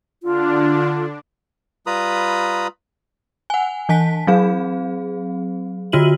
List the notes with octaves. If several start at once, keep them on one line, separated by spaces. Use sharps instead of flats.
D3 D4 F4
G3 F4 B4 A#5 B5 D#6
F#5 G#5
E3 G#5 A5 B6
F#3 C4 G#4 F5
D3 F4 F#4 D#7 F#7